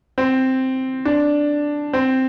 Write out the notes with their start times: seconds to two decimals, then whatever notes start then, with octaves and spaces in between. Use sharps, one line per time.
0.18 C4
1.05 D4
1.93 C4